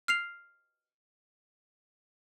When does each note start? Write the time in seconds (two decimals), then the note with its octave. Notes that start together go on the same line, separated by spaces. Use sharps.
0.08 F6 C7 F7